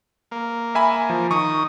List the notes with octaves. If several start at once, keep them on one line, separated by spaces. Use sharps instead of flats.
A#3
E5 G#5 B5
F3
D#3 C#6 D#6